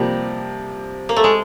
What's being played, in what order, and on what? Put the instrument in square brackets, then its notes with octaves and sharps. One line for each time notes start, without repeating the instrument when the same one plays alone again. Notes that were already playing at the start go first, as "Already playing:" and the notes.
Already playing: [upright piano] C3 F3 A#3 [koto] G3
[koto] A#3
A3
G#3